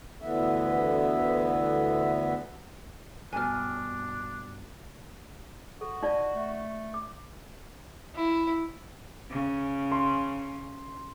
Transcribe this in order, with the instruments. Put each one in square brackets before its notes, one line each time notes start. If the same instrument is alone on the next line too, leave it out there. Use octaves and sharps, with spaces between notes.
[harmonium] D2 D3 E3 B3 E5
[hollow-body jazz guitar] G2 B2 [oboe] D4 [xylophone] G#5 F6
[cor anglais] F#4 [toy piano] A4
[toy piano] D#4 F4 D5 [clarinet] D#5
[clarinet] A3
[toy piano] D6
[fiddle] E4
[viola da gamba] C#3
[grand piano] C6